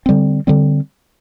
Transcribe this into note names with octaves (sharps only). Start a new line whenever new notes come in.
D3 G3 C4
D3 G3 C4